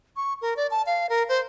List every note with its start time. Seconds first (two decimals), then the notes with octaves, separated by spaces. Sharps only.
0.16 C#6
0.41 A#4
0.57 D5
0.71 A5
0.86 F5
1.09 A#4
1.29 C5